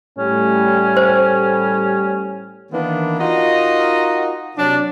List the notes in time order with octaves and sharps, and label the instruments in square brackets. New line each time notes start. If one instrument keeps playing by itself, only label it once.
[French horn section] A2 G3 [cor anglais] C#4
[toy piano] C5
[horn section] D#3 E3 A#3 B3 D4
D#4 F4 F#4 A#4 D#5
C3 F#3 D4